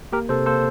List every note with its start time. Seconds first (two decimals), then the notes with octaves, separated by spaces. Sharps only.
0.12 A#3 G4 A#4
0.29 C3 A4 C5
0.46 A#3 A4 C5